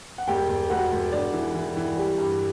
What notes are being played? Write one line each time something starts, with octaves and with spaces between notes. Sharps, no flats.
F#5
E1 G4 G5
E1
E1 F#4 F#5
E1
E1 D4 D5
E3
E3
E3
G3
G2